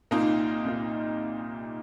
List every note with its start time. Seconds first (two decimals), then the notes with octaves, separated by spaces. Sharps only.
0.11 C2 A#2 A#3 D#4 F4 D#5
0.64 C2 A#2 A#3 F4